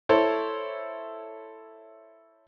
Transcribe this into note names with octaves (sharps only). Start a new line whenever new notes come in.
E4 A4 C5 C#5